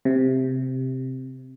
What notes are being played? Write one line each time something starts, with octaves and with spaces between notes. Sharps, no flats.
C3